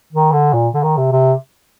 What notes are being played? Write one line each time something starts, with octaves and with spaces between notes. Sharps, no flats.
D#3
D3
A#2
D3
D#3
C3
C3